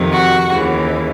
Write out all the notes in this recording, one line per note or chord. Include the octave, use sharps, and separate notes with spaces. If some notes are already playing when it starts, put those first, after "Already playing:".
Already playing: F2 C3 D#3
F#4
D#2 C#3 E3